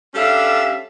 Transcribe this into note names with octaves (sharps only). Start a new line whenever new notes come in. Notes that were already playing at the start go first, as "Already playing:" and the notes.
G3 C#4 D4 A4 E5 F5